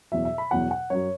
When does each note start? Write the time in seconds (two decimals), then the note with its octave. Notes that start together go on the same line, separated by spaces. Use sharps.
0.12 E2 B2 F#3 E5
0.25 E5
0.38 B5
0.51 E2 B2 F#3 F#5
0.71 F#5
0.90 F#2 F#3 C#5